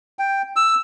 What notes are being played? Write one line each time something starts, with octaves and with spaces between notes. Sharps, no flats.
G5
E6